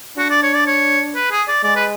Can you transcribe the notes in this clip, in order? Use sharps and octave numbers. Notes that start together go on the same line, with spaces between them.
D4 F#4
D5
C#5
D5
C#5
B4
G#4
D5
G#3 D5
B4